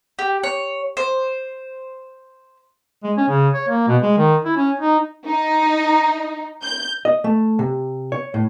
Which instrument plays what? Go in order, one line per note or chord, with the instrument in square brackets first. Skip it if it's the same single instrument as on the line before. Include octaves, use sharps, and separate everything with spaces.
[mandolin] G4
C#5
C5
[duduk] G#3
C#4
C#3
C#5
A#3
B2
G#3
D#3
E4
C#4
D#4
[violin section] D#4
G6
[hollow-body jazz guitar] D#5
A3
C3
C#5
A2